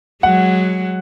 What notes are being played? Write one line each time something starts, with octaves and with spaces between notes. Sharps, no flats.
F#3 G#3 F#5